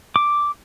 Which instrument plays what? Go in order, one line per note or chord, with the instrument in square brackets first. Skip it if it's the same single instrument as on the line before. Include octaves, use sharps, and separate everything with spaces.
[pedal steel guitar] D6